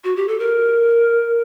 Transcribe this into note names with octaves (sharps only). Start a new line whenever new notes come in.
F#4
G4
A4
A#4